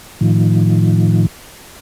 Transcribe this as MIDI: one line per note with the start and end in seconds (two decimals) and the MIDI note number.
0.21 1.26 45
0.21 1.26 51
0.21 1.26 53